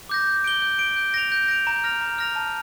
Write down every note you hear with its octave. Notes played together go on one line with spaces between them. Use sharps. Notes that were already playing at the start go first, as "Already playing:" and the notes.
D6 G6 A#6
G6
D7 G7
G6
D7 G7
G6
A#6 D7 F7
G6
A#6 D7 F7
A#5
F6 A#6 F7
A#5
F6 A#6 F7
A5